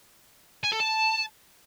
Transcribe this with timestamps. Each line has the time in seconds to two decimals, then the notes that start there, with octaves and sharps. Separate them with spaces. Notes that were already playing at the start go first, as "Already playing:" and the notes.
0.64 G#5
0.72 A4
0.80 A5